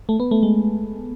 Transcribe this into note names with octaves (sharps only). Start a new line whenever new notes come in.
A3
B3
A3
G#3